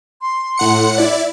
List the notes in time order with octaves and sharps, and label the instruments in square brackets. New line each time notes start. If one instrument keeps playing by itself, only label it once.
[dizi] C6
[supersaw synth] A2 F#5 C#7
E4 D5